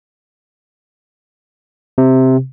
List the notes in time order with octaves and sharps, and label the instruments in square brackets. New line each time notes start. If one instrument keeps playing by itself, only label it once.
[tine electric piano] C3